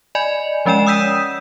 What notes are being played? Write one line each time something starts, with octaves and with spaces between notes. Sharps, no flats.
D5 D#5 G#5 B5
F3 G#3 C#4 D5 G5 E7
D#6 E6 G6 B6 D#7 E7